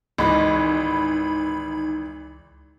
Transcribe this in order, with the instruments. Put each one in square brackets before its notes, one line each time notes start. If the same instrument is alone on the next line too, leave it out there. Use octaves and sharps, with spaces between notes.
[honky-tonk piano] G#1 E3 [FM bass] C#2 [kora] G#3 F#4 [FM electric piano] D#4 B5